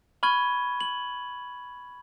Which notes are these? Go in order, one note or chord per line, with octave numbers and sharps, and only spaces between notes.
B5 C#6 F6 G#6 D#7 G7
F#7